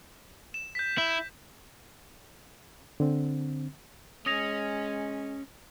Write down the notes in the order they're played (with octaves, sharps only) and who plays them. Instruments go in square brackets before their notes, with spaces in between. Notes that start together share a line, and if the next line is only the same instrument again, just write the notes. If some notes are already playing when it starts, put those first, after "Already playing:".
[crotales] E7
G6 B6
[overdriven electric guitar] E4
[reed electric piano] D3 C4
[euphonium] G#3 [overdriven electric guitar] C#4 [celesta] D#6 A#6 F7